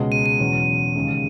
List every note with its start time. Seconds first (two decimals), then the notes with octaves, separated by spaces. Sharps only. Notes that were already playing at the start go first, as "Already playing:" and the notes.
Already playing: C#2 B2 G#3 C#4
0.12 D#7
0.26 D#7
0.39 E2 B2 F#3 C#4
0.95 D#2 C#3 G#3